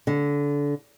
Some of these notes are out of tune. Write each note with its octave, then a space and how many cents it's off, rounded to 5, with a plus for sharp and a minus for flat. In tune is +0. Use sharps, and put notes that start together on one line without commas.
D3 -25